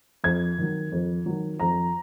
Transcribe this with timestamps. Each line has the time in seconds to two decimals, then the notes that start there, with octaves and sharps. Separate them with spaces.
0.24 F2 G#6
0.58 D#3 F#3
0.92 F2
1.26 D#3 F#3
1.60 F2 A#5